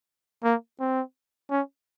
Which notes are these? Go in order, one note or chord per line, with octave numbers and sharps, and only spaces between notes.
A#3
C4
C#4